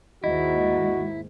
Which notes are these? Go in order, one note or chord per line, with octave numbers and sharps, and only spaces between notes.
D#2 G#2 E4 F#4 D#5